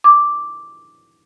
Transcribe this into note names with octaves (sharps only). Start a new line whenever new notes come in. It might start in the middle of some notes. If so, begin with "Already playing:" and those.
D6